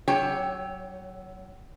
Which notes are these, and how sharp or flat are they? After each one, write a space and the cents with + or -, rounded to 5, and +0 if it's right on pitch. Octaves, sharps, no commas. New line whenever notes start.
F#3 +25 C#5 +0 G5 +0